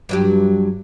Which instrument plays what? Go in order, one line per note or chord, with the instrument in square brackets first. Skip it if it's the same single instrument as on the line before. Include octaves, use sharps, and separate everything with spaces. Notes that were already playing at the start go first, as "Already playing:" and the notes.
[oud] G2 F#3 G4